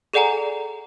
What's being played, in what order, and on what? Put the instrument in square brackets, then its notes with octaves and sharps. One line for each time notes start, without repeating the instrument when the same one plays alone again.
[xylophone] G#4 A4 D5 F#5 G#5 A#5